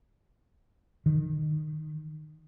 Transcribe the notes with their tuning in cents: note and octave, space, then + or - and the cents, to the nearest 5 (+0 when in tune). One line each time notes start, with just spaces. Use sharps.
D#3 -20